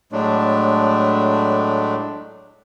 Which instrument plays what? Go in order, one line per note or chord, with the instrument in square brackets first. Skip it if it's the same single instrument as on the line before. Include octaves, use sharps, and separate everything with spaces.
[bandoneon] A2 F#3 G#3 A3 D4